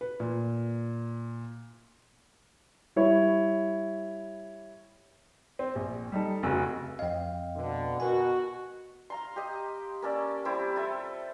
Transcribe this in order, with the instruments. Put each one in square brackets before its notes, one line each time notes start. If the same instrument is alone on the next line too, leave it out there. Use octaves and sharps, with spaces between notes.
[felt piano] B4
A#2
[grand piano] G3 E4 C#5
[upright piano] C4
A#1
G3 D#4 A4
F1 C#3 F#4 E6
[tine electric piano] F2 F5 [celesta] D#5 G5
[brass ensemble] B2 D3
[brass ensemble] B2 [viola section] F#4 [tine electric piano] A#4 G#5
[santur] F5 A#5 C6
G4 D#5
A#3 C#4 A4 D5
G3 C4 E4
F4 A4 E5